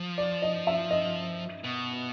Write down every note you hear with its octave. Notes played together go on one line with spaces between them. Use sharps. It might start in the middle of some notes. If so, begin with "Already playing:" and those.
Already playing: F3
D5
D#5
E5
D#5
B2